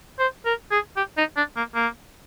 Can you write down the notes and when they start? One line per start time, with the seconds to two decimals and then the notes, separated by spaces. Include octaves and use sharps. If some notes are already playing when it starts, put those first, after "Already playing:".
0.19 C5
0.46 A#4
0.71 G#4
0.97 G4
1.17 D#4
1.37 D4
1.57 A#3
1.75 A#3